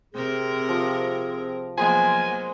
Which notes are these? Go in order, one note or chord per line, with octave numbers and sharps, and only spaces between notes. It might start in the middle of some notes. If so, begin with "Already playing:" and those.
C3 C4 G#4 A#4
F3
F3 F#3 G#3 A#3 B3 C5 G#5